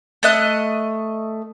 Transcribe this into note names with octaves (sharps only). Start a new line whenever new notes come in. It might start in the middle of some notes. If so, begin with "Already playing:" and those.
A3 D#5 F#6